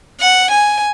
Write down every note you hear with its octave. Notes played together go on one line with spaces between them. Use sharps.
F#5
G#5